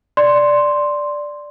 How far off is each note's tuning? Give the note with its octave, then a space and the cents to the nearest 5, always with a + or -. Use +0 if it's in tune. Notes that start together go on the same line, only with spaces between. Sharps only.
D5 +0 C6 +0